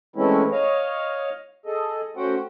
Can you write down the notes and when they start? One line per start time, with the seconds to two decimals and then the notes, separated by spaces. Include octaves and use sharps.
0.16 E3 G#3 A3 C4 C#4 E4
0.52 C#5 D#5 F5
1.66 G#4 A4 D#5
2.17 A3 C#4 F#4 C5 F#5 G5